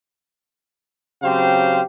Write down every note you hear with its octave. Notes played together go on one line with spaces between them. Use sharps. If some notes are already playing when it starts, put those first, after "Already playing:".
C#3 F#3 C4 G4 C5 F5